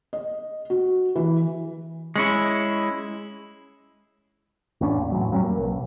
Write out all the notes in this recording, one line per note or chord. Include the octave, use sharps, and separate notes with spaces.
D#5
F#4
E3
G#3 C#4 E4
A1 E2 C#4 D4
A#2
E2 A2 F#3
F2 F#3 G3 C#4
A#3
B1